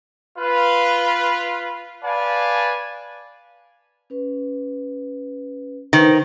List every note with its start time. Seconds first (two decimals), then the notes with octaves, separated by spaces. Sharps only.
0.38 F4 B4
2.04 B4 D5 F5 G#5 A5 B5
4.10 C#4 B4
5.93 D#3 D#4 B4 C5